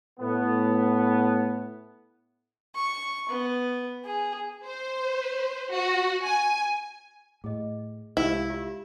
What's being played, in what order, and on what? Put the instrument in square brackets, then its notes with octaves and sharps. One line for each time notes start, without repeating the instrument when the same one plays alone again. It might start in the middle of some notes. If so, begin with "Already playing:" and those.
[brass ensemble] A2 B3
[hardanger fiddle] C#6
B3
G#4
[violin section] C5
F#4
G#5
[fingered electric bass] A2 [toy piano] G#4 D#5
[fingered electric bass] C2 G#3 [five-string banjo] E4 [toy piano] G4 F5
[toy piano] F4 G4 E5